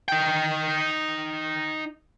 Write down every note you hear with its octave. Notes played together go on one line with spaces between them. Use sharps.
D#4 G5